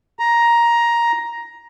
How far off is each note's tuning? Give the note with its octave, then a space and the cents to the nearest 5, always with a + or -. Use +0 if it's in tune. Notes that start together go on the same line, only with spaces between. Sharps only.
A#5 +10